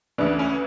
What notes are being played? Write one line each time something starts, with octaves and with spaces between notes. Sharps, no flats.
D2 C#3 E3 D4
C#4